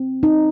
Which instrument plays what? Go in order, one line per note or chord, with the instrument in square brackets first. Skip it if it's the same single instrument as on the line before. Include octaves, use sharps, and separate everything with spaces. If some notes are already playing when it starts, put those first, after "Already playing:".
Already playing: [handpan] C4
D#4